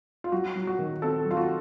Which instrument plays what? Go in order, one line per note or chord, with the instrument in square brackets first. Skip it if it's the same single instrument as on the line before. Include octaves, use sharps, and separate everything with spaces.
[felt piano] F4
[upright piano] F#3 [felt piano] F#4
[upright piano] F#3
[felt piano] F#4
[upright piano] D#3
[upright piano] C4 [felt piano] A4
[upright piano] F#3
[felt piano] F4
F#4